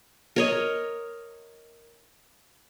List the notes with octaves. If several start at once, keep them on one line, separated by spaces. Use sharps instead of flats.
A#4 C#5 D#5